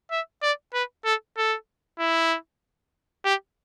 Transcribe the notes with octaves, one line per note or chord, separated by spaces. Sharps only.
E5
D5
B4
A4
A4
E4
G4